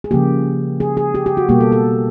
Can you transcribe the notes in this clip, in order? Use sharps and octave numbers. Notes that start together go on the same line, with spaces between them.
G#4
C#3 F3 A#3 G4
G#4
G#4
G4
G4
F#4
B2 G3 A#3 G4
A4
A4